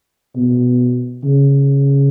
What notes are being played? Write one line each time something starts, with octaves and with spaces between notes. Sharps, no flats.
B2
C#3